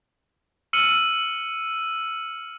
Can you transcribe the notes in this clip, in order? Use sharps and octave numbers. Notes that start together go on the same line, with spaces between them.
E6 F6 C#7 D#7 F#7